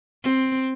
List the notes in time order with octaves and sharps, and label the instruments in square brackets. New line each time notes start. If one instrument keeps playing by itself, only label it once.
[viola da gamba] C4